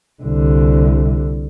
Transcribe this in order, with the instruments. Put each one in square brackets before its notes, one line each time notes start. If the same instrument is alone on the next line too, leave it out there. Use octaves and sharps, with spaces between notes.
[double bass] C2 D3